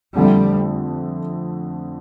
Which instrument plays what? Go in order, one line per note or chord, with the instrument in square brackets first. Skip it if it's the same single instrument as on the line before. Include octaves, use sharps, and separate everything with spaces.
[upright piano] F2 D3 A3 [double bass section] G3